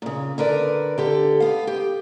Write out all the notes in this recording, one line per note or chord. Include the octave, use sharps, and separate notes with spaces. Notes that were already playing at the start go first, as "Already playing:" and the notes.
A#2 C#3
D3 A#4 B4 D5
D3 G4 A4
B3 F5
G4